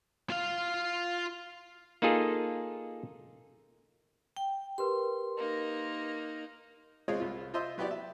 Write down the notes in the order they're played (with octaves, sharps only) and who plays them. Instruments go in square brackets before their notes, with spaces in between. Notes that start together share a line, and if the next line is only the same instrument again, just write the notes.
[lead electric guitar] F4 F5
[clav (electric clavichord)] A#3 D#4 F4 G#4 A4
[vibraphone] G5
[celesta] G4 A#4 B4 [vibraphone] C6
[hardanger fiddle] A#3 D#4
[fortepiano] G#3 C4 F4 G#4 C#5 F5
C2 F4
F4 C5 D#5 E5 C6 E6
F#3 B3 E4 G4 D5
E5